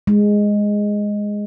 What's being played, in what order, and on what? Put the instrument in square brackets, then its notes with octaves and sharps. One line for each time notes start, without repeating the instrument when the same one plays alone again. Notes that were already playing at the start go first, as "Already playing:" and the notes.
[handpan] G#3